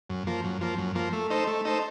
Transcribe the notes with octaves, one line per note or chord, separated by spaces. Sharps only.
F#2
F3 A#3
F#2
F3 A#3
F#2
F3 A#3
A3
D#4 A4 C5
A3
D#4 A4 C5